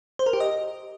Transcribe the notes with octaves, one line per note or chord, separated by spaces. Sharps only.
C5
A#4
G4
D#5